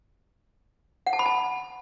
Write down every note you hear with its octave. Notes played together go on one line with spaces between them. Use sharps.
F#5
A5
B5
A5